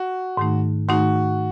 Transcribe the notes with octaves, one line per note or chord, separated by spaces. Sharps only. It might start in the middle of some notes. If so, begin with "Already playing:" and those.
Already playing: F#4
G#2 D#3 A3 D#4
G#2 D#3 A3 D#4 F#4